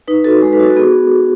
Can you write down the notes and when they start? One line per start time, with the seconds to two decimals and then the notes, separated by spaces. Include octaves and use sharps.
0.08 D#4 B4
0.24 F#4 A4
0.42 G#3 A4
0.53 B4
0.60 F#4
0.64 A4
0.70 F#4
0.77 B3 G#4